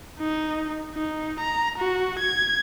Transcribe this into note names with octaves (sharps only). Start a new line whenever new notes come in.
D#4
D#4
A#5
F#4
G#6